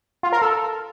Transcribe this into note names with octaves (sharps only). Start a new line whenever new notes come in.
F4
A#4
A4